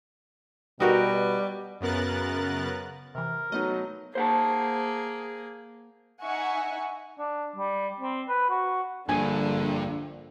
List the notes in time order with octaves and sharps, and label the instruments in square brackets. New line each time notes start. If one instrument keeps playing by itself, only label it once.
[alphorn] B2 [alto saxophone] G3 [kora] D#4 F#4 A#4 [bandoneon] B4 G5
[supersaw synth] F#2 C#3 B3 A#4 F#6 A6
[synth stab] C3 E3 [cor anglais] A#4
[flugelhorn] F#3 [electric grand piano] A3 B3 D#4 [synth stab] D#5
[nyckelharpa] A#3 G#4 [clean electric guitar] C5 F#5 A5
[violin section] D#4 E5 F#5 G#5 C#6
[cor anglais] D4
G3
C4
B4
F#4
[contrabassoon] A#1 [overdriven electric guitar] G2 [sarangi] D3 [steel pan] G#5